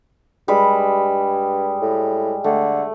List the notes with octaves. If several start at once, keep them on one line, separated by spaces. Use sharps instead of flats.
G2 G3 G#3 B5
A2
D3 A3